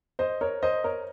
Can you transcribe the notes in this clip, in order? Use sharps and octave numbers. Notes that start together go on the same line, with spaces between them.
C5 D#5
A#4 C#5
C5 D#5
A#4 C#5